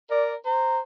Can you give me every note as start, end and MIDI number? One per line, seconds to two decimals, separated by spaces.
0.11 0.33 70
0.11 0.33 74
0.46 0.79 72
0.46 0.79 82